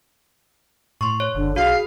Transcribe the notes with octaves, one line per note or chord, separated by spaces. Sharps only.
A2 C6 C#6
C#5
F#1 D3
B1 F#4 G#4 F5